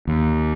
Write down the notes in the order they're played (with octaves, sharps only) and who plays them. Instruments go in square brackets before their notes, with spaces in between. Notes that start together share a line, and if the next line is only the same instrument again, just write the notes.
[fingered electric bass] D#2